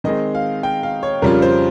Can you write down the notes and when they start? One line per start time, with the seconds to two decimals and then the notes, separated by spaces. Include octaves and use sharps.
0.04 D#3 G#3 C4 D#5
0.35 F5
0.63 G5
0.83 F5
1.03 C#5
1.22 F2 C#3 G3 C#4 F4 A#4
1.42 C5